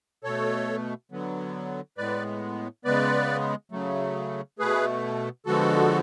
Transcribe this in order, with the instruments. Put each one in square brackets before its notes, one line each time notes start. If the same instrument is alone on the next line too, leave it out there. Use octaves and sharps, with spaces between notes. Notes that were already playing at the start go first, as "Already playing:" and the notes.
[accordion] B2 A3 A4 C#5
D3 F#3 B3
A2 G#3 B3 B4 D5
C#3 G#3 B3 B4 D5
C#3 F#3 A3
B2 A3 G#4 B4
D3 F3 G#3 B3 F#4 A4